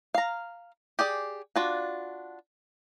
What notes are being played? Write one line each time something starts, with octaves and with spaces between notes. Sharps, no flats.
F5 A#5
G4 G#4 D5
D4 F4 F#4